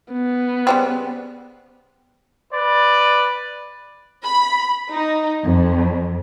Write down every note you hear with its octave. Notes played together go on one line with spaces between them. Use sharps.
B3
C#3 G3 C4
B4 D5
B5
D#4
F2